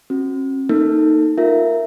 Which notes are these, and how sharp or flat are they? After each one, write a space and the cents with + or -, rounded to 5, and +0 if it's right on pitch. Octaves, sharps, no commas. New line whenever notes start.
C#4 -45 F#4 -5
A#3 +0 D#4 +0 A4 +15
F4 +0 A#4 +0 E5 +0